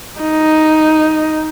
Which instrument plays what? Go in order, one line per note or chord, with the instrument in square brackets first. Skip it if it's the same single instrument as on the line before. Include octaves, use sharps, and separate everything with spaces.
[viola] D#4